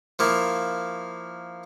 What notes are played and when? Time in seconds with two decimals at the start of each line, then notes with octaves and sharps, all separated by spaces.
0.19 F3 A#3 E4